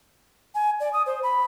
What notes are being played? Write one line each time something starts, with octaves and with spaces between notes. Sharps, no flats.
G#5
D5
D#6
C5
B5